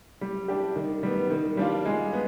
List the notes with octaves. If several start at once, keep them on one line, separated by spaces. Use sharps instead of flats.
G3
D4 G4
D#3
G3 B3
D#3
G3 D4 F4
G#3
B3